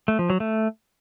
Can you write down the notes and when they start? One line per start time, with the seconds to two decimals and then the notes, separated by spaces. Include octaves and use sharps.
0.08 A3
0.19 F3
0.30 F#3
0.40 A3